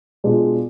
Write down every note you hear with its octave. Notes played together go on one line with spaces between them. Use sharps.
B2 G#3 D4 F4